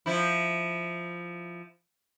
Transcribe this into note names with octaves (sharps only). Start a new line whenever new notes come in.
F3 E4